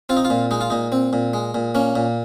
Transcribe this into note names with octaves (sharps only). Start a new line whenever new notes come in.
C4 F4
D#4
F4
A#2
G#3 D#4
F4
A#2 D#4
C4
A#2
G#3
A#2
A#3 C#4
A#2